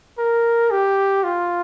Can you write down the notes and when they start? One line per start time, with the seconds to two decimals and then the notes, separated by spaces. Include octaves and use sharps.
0.18 A#4
0.71 G4
1.24 F4